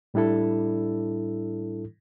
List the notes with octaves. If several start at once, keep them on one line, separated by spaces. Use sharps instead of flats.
A2 G3 D4 E4 A4